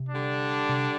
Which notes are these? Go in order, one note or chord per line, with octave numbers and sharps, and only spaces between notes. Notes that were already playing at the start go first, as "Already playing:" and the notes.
Already playing: C3
D3 G3 D4
C3